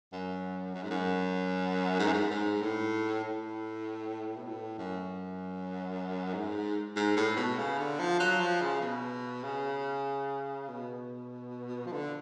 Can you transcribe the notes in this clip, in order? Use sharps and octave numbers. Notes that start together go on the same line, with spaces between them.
F#2
F#2
G#2
F#2
G#2
F#2
G#2
G#2
A2
A2
B2
A2
F#2
G#2
G#2
A2
B2
C#3
D3
F3
F#3
F3
C#3
B2
C#3
B2
F3
D3